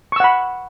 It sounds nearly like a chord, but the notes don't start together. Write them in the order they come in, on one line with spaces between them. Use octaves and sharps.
C#6 E6 F#5 B5